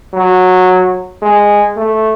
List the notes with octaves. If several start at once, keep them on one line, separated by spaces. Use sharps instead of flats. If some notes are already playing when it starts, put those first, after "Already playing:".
F#3
G#3
A3